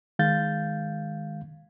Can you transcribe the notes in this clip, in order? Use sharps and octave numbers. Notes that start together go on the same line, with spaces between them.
D#3 G#3 F5 G6 A6